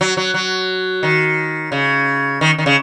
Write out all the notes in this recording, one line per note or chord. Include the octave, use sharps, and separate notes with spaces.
F#3
F#3
F#3
D#3
C#3
D#3
D#3
C#3